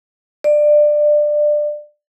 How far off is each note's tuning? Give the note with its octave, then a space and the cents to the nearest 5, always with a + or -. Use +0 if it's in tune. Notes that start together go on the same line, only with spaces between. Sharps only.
D5 +20